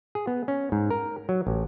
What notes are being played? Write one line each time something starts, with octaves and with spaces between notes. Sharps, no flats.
G#4
B3
C#4
G#2
A#4
F#3
A1